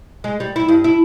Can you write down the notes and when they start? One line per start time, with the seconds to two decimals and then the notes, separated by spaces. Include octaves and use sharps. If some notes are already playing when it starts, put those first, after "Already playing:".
0.24 G#3
0.40 G3
0.56 E4
0.68 G2
0.84 E4